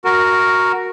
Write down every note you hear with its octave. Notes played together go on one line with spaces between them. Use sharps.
F#4 A#4